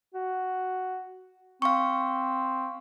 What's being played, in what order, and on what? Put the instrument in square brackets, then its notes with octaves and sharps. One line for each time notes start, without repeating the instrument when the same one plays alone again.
[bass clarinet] F#4
[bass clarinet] C4 [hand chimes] F5 C#6